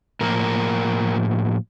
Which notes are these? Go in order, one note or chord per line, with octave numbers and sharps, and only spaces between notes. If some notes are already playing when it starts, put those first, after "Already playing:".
A2 F3 A#3 A#4